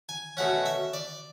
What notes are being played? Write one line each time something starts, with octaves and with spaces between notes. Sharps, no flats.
G#5
B2 A3 C#4 F#5
E5
D5